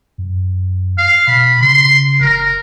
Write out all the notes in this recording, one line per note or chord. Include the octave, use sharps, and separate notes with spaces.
F#2
F5
B2 B5
C#3 C6
F#1 A#4